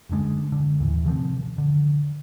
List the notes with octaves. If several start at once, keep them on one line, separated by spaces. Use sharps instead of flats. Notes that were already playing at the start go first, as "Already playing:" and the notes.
F#1 F#2 D3 G#3
D3
D#2 A2 E3
C3 D#3 F3 C4
D3